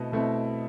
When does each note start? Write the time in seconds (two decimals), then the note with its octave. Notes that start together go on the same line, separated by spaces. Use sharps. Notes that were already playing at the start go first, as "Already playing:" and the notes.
Already playing: B2 A3 C4 E4 D#5
0.12 B2 A3 C4 E4